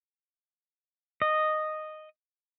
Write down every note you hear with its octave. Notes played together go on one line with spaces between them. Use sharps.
D#5